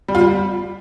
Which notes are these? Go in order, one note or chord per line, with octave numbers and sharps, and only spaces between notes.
G3
F4
G3